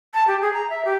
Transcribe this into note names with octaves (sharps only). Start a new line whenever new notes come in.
A5
G4
G#4
A#5
E5
G4